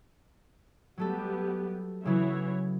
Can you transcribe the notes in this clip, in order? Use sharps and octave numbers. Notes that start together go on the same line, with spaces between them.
F#3 G3 A3 B3 G4 A4
C#3 E3 F#3 E4 C#5